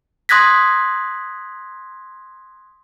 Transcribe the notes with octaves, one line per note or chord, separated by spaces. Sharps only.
C6 D#6 F#6 G#6 A#6 B6